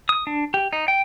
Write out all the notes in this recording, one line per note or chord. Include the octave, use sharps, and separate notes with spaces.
D#6
D4
G4
D#4
G5